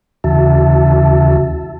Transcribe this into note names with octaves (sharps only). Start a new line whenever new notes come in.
D#2 C#3 E3 F#4 E5 A5